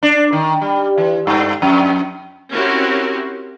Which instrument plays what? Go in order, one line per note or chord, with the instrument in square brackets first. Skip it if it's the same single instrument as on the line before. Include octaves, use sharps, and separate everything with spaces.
[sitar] D4
D#3
G3
E3
G2
F2
[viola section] C4 C#4 E4 F#4 G4 A#4